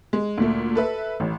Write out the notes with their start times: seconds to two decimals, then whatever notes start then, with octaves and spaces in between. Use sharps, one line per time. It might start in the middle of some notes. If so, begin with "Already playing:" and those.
0.13 G#3
0.38 D2 A#2 A3
0.75 A4 B4 E5
1.20 A1